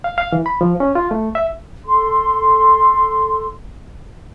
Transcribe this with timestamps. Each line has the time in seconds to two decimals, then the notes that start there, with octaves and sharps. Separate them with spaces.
0.04 F5
0.18 F5
0.33 E3
0.46 B5
0.61 F3
0.80 C#4
0.95 F4
1.11 A3
1.35 E5
1.85 A4 C6